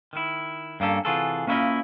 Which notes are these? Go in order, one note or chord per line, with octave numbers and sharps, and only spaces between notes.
D#3 E4
G2 A#3 C#4 A4
C3 E3 F4 F#4 G#4 A4
A#3 C#4 D4 E4 F4 D#5